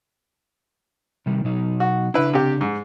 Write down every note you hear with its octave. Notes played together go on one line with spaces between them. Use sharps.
C3 D#3 G3
B2 F#3 D#4
F#4
C#3 D4 E4 B4
C3 G4
G#2